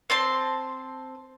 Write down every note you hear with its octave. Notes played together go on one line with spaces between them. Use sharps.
C4 A5 C6